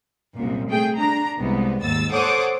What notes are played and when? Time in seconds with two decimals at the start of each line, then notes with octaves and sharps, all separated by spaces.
0.35 C2 F#2 A#2
0.68 A3 G#4 G5
0.98 D4 A#5
1.38 C2 G#3 B3
1.82 D#2 G#2 E6 A6
2.12 A4 C5 C#5 F#5 D6 D#6